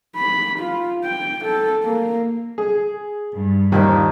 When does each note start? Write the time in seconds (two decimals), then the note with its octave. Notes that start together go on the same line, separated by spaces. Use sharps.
0.16 B5
0.60 F4
1.05 G5
1.45 A4
1.84 A#3
2.58 G#4
3.35 G2
3.72 D#2 A#2 D#3 F3 G3